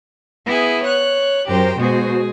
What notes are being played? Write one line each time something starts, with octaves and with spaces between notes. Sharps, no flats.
B3 E4 G#4
C#5 F#6
F#2 G4 A#4 C5 G5
B2 G#3 F#4 G#4 C5